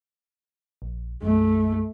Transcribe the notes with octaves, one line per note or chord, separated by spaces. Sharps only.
A#1
B1 F#2 A3